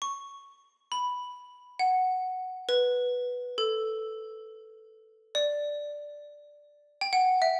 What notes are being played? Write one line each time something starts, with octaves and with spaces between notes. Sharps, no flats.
C#6
B5
F#5
B4
A4
D5
G5
F#5
E5